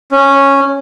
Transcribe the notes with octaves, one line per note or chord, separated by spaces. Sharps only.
C#4